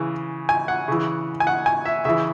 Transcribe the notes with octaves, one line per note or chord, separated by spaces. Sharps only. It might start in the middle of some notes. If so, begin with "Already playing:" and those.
Already playing: C#3 E3
G#5
F#5
C#3 E3
G#5
F#5
G#5
E5
C#3 E3 E5